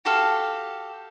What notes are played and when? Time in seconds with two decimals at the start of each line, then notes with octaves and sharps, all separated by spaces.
0.05 F#4 G4 A4 F5